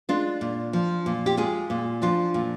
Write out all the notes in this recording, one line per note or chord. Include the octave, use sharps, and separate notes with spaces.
G#3 D4 F4
A#2
F3
A#2
G4
G#3 F4 G#4
A#2
F3 D4 F4
A#2